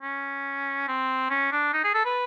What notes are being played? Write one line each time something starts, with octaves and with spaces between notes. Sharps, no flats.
C#4
C4
C#4
D4
D#4
G#4
A4
B4